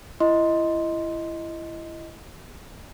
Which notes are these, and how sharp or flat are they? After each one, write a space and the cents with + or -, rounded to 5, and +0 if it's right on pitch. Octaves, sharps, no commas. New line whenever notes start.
E4 +30 D#5 +10 C6 -5